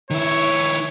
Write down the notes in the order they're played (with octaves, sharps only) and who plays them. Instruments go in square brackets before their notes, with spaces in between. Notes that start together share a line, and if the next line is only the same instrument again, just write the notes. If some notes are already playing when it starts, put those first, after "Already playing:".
[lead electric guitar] D#3 E4 [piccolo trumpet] C#5